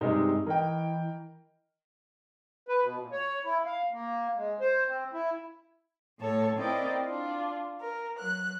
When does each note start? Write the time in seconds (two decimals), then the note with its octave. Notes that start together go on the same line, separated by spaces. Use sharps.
0.01 G2 C3 G3 G#3 D#4
0.46 E3 A#4 D#5 G5
2.68 B4
2.82 B2
2.99 A#2
3.12 C#5
3.45 E4
3.66 F5
3.93 A#3
4.37 G#3
4.60 C5
4.88 C4
5.14 E4
6.18 A2 A4 C#5 A5
6.56 C4 E4 A#4 D5 D#5 G5
7.06 D4 F4
7.80 A#4
8.17 F#3 F#6